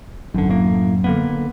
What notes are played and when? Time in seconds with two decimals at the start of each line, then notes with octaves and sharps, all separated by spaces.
0.34 G#1 F#2 D3
0.50 A2 A#3
1.04 D3 A#3 B3